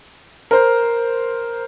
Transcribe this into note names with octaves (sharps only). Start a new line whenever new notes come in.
A#4 C5